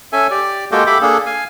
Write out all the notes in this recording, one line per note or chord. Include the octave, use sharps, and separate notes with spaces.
C#4 A4 E5 G#5
G4 D5
G#3 A#3 F#4 G4 A4 G5
G4 A4 E5 G5 B5 D6
A#3 D4 G#4 A4
F5 G#5